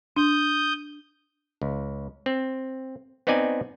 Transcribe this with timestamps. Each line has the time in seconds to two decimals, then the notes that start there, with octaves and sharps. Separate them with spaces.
0.16 D4 D#6 G6
1.62 C#2
2.26 C4
3.27 B3 C4 D#4 D5 G#5